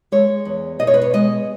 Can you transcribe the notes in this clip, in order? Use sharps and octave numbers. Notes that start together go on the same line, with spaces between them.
G#3 C#5
E2
B2 D#5
C#5
B4
C#5
G#3 D#5